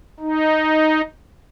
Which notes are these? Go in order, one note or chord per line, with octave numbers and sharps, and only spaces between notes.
D#4